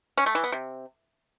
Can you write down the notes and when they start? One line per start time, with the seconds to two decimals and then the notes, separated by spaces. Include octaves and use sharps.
0.18 C#4
0.26 A3
0.35 E3
0.44 B3
0.52 C3